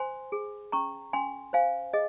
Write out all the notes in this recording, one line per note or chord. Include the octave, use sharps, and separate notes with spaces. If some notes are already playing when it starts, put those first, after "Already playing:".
Already playing: C5 G#5 C6
G#4
C#4 A#5 C#6
C#4 G#5 C6
C5 F5 G#5
G#4 D#5